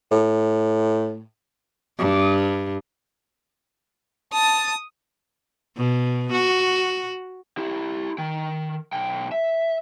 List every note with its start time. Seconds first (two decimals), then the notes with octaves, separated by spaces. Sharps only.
0.11 A2
1.99 G2
4.33 A5 D#6
5.77 B2
6.32 F#4
7.57 E4 G4
8.18 D#3 G5
8.93 B1 G5
9.32 E5